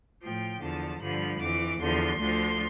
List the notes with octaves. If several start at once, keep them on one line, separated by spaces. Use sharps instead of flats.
A2 F3 G5
E2 D3 F3 A5
G2 D3 F3 B5
F2 E3 D6
E2 D3 F3 C6
D2 D3 F3